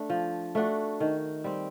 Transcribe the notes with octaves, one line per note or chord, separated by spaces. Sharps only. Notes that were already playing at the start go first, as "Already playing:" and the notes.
Already playing: A3 D4
F3
A3 D4 F#4
D#3
G3 C4